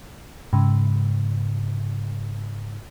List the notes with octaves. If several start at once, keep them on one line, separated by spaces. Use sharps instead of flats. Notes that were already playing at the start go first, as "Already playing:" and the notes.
G#2 C#3